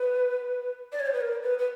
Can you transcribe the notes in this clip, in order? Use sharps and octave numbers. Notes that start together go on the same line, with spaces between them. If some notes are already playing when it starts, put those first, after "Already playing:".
Already playing: B4
D5
C#5
C5
B4
A#4
B4
B4